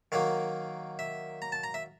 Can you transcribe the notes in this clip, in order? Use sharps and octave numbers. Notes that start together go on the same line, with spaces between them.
D#3 F#3 A#3 F5
E5
A#5
A5
A#5
E5